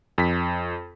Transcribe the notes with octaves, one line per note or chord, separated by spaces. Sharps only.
F2 B6